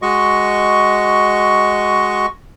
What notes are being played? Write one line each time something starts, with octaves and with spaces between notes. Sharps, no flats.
G#3 F#4 D#5 C#6